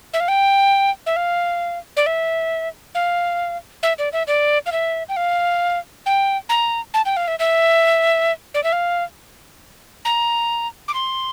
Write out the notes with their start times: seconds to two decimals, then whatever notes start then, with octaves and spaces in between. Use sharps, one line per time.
0.14 E5
0.20 F5
0.28 G5
1.06 E5
1.16 F5
1.97 D5
2.06 E5
2.95 F5
3.83 E5
3.99 D5
4.13 E5
4.27 D5
4.66 F5
4.72 E5
5.09 G5
5.16 F5
6.06 G5
6.49 A#5
6.94 A5
7.06 G5
7.17 F5
7.28 E5
7.39 E5
8.54 D5
8.64 E5
8.73 F5
10.05 A#5
10.88 D6
10.94 C6